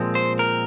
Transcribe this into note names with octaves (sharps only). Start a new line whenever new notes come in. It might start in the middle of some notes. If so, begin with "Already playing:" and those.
Already playing: A#2 F3 G#3 C4
C5
A#4